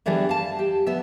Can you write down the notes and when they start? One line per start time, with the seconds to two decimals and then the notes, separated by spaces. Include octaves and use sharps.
0.06 D3 E3 G3 B3 G#4 A4
0.29 F5 A5
0.59 G4
0.86 G3 B3 E5